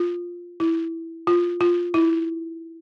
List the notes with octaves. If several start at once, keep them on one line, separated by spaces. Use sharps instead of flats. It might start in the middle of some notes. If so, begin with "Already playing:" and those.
Already playing: F4
E4
F4
F4
E4